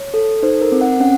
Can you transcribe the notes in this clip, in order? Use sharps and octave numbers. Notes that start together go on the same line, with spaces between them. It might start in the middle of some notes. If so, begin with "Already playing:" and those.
Already playing: C#5
A4
D#4 C5
A#4
C4
F#5
C#4 F#5